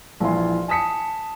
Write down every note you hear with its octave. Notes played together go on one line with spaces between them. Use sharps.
A#1 E3 F4 G#5 C6
G#5 A5 D#6 B6 C#7